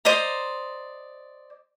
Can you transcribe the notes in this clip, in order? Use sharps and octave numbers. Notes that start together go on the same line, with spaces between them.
C5 D5 D#5 A#5